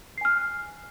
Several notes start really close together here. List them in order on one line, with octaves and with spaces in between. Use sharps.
C7 G#5 F6 F#6